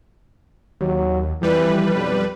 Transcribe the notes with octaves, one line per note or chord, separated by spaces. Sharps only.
D#2 F#3
F2 E3 G3 B4
B1